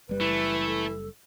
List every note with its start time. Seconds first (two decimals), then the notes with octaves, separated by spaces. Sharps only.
0.09 F#1 G3 B4
0.21 E3 A3
0.67 A4